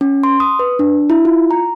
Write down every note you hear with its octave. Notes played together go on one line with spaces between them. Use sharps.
C#4
C6
D#6
B4
D4
E4
F4
A#5